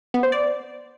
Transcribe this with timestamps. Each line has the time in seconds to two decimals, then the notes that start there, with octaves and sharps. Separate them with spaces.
0.14 B3
0.23 C5
0.32 D5